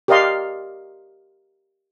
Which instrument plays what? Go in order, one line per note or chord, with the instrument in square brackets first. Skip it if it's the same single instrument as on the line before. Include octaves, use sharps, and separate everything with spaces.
[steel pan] G4 A#4 D5 D#5 F5 C6